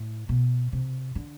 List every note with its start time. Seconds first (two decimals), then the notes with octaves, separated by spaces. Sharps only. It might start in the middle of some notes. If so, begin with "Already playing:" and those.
Already playing: A2
0.29 B2
0.73 C3
1.15 D3